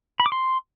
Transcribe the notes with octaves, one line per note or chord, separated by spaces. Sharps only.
B5
D6
C6